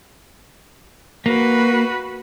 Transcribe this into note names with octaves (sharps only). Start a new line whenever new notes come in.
A#3 F#4 B4